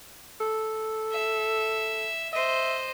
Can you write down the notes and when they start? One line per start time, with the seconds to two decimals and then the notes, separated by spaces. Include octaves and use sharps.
0.41 A4
1.11 E5
2.33 C5 D#5 E5